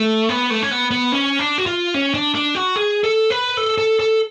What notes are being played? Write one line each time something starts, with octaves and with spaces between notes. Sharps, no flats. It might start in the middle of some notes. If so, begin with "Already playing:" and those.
Already playing: A3
B3
A3
C#4
B3
B3
C#4
D4
F#4
F4
C#4
D4
D4
F#4
G#4
A4
B4
A4
A4
A4